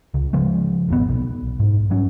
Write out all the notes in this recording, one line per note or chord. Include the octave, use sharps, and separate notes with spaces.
C#2
C#3 F3 G#3
D#1 G#1 B3
B1
G#2
G#2 F#3 C#4